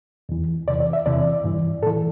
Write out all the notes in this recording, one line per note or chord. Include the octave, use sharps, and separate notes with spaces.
E2 E3
E2 C3 E3 D5
D5
E5
E2 C3 E3 D5
G2 E3
A2 E3 A4